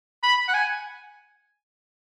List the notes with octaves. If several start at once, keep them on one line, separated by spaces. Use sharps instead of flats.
B5
F#5
G#5